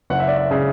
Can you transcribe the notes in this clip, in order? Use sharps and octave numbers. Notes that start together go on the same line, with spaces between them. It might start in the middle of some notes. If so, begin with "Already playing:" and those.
F#1 F#5
E5
D5
E5
C#3